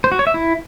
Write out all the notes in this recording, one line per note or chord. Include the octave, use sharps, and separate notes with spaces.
C5
F#4
C#5
E5
E4